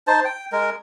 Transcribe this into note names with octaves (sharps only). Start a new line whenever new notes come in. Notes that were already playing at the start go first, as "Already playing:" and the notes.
D#4 C5 A5
G5
G#3 A#4